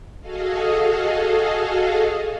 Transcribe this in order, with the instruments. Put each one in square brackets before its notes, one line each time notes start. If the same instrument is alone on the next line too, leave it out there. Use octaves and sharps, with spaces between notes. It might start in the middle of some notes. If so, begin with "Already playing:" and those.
[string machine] F#4 G#4 A4 D#5 F5